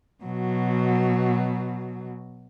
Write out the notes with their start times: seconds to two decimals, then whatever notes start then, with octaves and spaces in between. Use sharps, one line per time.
0.24 B2 F#3